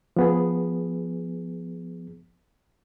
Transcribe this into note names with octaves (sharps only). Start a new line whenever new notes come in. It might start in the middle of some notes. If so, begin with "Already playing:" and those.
F3 B3 G#4